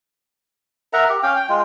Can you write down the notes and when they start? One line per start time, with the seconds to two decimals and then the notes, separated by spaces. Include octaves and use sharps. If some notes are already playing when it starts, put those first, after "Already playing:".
0.93 A#4 E5 F#5 A#5
1.09 G4
1.23 C#4 F5 G5
1.36 G5
1.49 G#3 F4